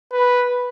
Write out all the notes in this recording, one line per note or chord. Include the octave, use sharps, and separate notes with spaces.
B4